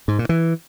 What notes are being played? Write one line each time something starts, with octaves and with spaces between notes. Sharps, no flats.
G#2
A#2
E3